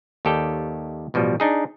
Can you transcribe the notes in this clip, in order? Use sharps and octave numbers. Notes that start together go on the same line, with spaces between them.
D#2 D#3 G4 A4 D5 G5
A1 B2 F3 G3
D4 D#4 G#4